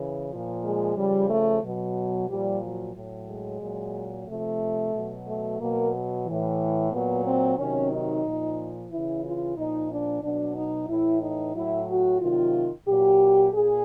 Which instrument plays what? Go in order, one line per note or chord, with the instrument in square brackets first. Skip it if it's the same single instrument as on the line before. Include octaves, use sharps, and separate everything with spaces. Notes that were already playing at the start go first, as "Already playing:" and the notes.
Already playing: [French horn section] C#3 E3
A#2 F3
G#3
C#3 F3 G3
A3
B2 F#3
A#2 F3 G3
F#3
A2 F#3
G#3
A#2 F#3
C3 F3 A3
B2 F#3
A3
B2 F#3 A#3
A2 E3
A#2 F#3 B3
C4
C3 D#3 F#3 C#4
D#4
A#2 F3
C#3 E3 E4
F4
A#2 F3 D#4
D4
B2 F#3 D4
D#4
A2 E3 E4
D#4
A2 F#3 E4
F#4
C3 D#3 F#3 F4
A#2 F#3 G4
A#2 G#4